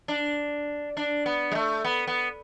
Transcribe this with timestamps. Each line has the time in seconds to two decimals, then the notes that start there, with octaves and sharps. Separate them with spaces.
0.08 D4
0.97 D4
1.26 B3
1.52 G#3
1.55 A3
1.85 B3
2.07 B3